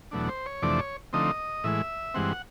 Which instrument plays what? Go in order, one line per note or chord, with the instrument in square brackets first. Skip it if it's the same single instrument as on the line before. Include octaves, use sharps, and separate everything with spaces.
[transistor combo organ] E2 B2 F#3 A3 D4
C5
C#5
F2 C3 E3 A3 D4 D5
C#5
D3 F3 A3 C4 D#4 D#5
A2 E3 G#3 E5
G2 E3 G#3 C4 F#5